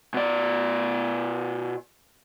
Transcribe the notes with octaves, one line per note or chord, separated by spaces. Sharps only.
B2 D5